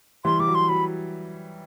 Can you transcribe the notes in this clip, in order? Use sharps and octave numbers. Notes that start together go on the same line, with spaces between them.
E3 G3 C6
G3 D6
F#3
C6
F#3 B5